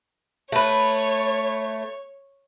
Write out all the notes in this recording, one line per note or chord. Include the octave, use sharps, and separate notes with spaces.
A3 B4 C#5